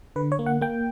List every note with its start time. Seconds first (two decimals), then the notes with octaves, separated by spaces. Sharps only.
0.16 D3 B4
0.32 C#5
0.39 A#3
0.46 F#5
0.61 A#3 G5